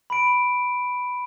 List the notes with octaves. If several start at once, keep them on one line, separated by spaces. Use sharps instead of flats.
B5 D7